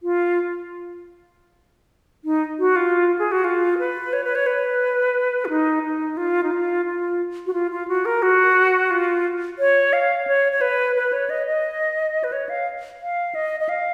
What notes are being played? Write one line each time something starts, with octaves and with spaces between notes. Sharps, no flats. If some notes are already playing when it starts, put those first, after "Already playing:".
F4
D#4
F#4
F4
G#4
F#4
F4
B4
C#5
B4
C#5
B4
F4
D#4
D#4
F4
D#4
F4
F4
F#4
F4
F4
F#4
A#4
F#4
F4
C#5
F5
C#5
C#5
B4
B4
C#5
D#5
D#5
B4
C#5
F5
F5
D#5
D#5
F5